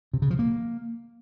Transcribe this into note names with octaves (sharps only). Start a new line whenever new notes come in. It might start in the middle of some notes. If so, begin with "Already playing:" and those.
C3
C#3
F3
A#3